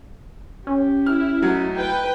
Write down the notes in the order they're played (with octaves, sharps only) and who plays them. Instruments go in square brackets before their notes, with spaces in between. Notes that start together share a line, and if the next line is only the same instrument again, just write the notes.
[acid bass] C#4 [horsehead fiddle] G4
[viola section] E4 [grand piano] F6
[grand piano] F#3 [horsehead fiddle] A3 D#4
[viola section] B4 G5